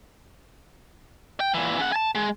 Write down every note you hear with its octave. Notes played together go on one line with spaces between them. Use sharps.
G5
A#2 E3
C#3 F#5
G#5 A5
G#3